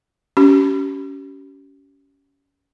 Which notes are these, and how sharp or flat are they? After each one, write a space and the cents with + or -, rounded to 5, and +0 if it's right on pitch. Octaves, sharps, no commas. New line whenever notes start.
C#4 +20 G4 -35